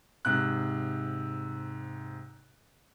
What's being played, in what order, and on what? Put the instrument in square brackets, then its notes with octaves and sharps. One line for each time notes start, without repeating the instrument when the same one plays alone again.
[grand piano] G#2 C3 F#6